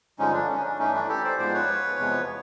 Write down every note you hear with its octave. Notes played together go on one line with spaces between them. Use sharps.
G2 D3 F3 G#3 C#4 D#4
D4
C#4
D4
G2 E3 A3 C#4 D#4
D4 E4
G4 A4
C5 D5
G#2 F3 G#3 B3 C5 D5
B4 C#5
E2 C3 F3 G#3 B3